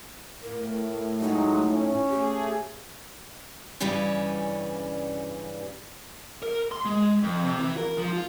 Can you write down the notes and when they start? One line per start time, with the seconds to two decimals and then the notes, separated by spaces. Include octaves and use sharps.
0.43 A2 A#4
1.21 F#3 G#3 D#4
1.72 C#4
2.09 A3 G4 G#4
3.80 G2 C#3 E3 G3 C#4
6.43 A#4
6.72 C6
6.85 G#3
7.23 F2
7.44 C3
7.59 E3
7.77 A#4
7.98 F3
8.13 F4